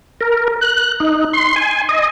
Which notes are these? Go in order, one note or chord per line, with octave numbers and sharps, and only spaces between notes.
A#4
F#6
D#4
C6
G#5
D#5